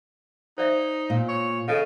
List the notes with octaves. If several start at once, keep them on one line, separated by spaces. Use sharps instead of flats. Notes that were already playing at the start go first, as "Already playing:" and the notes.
D#4 C5 D5 E5
A#2
C#5
C#3 A4 D#5 F5